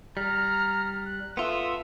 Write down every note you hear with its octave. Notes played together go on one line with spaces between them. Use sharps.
G3 A#5 F6
F#6
B3 F4 A4 E5 C6 D#6